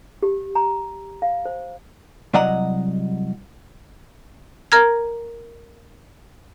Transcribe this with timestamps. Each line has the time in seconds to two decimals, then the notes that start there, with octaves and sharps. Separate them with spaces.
0.23 G4
0.55 A#5
1.22 F5
1.45 C5
2.34 C2 F#3 D5 D#5 F#5 A#5
4.72 A#4 A#5 F6 G#6